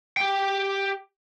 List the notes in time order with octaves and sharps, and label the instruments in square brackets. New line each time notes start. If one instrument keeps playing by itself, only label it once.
[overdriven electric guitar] G4 G5